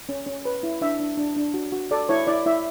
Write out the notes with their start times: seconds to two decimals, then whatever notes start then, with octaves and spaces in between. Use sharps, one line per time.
0.09 C#4
0.27 C#4
0.45 B4
0.63 E4
0.81 D4 E5
1.00 D4
1.17 D4
1.36 D4
1.54 F#4
1.72 F#4
1.91 A4 D5
2.09 E4 C#5
2.27 E4 D5
2.46 E4 E5